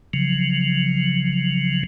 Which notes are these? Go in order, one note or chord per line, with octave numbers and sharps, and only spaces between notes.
C#3 F3 F#3